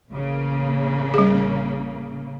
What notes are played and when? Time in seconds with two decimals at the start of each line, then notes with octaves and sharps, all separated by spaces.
0.11 A1 C#3 A#3
1.14 G3 G#4